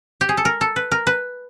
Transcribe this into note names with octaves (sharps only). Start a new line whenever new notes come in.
G4
G#4
A4
A#4
A4
B4
A#4
B4